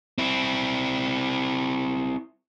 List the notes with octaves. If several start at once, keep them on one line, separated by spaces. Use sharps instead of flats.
C4 E4